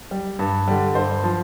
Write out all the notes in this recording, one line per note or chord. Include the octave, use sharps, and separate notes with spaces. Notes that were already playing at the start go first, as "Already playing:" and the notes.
G3
G2
D3 G3
G2 C5
F3